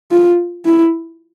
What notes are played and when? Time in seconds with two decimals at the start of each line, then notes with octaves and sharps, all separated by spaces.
0.11 F4
0.65 E4